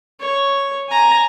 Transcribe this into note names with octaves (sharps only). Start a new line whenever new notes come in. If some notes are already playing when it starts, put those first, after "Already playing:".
C#5
G#5 A#5